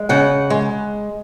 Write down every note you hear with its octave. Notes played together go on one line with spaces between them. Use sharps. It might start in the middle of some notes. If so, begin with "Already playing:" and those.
Already playing: G#3
C#3 F#5
G#3